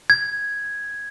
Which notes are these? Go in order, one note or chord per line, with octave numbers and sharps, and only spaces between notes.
G#6